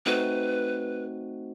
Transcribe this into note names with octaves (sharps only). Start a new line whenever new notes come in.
A3 C4 D#4 F#4 B4